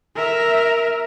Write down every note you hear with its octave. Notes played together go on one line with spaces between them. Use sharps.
A#4 E5